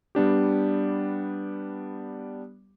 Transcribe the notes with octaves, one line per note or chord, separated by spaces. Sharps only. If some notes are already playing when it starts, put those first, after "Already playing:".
G3 B3 D4 G4